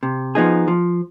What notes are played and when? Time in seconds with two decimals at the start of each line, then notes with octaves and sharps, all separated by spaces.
0.03 C3
0.35 F3 B3 D#4 G#4
0.68 F3